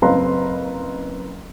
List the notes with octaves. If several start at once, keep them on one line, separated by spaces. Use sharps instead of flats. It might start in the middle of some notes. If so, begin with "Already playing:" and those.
F#1 C4 B4 F5 A#5 C6